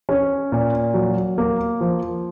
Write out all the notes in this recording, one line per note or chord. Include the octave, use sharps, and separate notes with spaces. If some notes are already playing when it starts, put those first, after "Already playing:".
C#4
A#2
F#3
A#3
F3